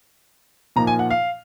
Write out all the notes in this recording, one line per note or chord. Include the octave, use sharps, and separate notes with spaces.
A#2 F3 A#3 D#4 A#5
G#5
F#5
F5